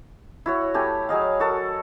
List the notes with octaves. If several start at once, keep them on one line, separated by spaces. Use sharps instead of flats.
E4 F#4 C#5
A3 G4 G#5 B5
F#3 G#4 D#5 F5
F#4 A4 A#4